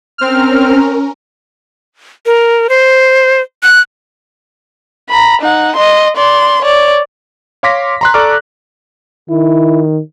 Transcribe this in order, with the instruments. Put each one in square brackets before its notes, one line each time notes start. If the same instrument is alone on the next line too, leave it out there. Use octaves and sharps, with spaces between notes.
[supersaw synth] C4 F6 [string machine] C#4 A#4
[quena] A#4
C5
F#6
[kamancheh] A#5 B5
D#4 F#5
D#5 C6
D5 C6
C#5 D5
[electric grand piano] C#5 F5 C6 D6 A#6 B6
A#5 C6 F#6
A4 D5 A#5 C#6 D6 F6
[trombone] D#3 [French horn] E4